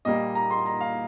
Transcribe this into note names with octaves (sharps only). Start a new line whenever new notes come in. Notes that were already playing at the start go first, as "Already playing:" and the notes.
A#2 G3 A#3 D#5
A#5
C6
A#5
F5